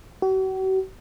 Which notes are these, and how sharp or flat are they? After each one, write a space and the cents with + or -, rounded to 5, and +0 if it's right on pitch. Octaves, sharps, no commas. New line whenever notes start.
F#4 +45